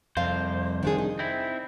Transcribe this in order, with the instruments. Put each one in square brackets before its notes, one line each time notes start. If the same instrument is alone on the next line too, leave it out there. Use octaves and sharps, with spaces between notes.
[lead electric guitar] C2 C5 [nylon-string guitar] F2 A#3 F5
[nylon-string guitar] D#3 D4 G#4
D#4
[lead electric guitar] C4 E4